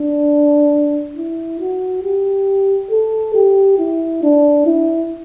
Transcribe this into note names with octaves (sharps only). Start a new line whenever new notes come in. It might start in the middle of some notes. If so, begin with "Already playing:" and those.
Already playing: D4
E4
F#4
G4
A4
G4
E4
D4
E4